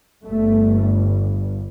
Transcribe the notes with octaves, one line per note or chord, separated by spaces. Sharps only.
G1 G2 A3